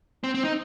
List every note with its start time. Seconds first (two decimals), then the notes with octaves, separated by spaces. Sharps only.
0.24 C4
0.35 C4
0.44 D#4